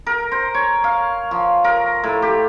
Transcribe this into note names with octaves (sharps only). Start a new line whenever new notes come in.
A#4
C5
C#5
F5
F3
A#4
A2
G4